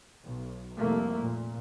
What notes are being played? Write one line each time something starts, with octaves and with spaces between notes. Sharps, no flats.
B1
F1 C2 A3 A#3
A#2